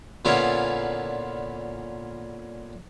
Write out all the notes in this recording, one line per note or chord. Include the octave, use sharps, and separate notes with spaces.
A#2 D3 B3 C#4 E4 F4